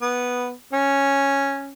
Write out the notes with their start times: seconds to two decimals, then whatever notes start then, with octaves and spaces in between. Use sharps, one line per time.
0.02 B3
0.73 C#4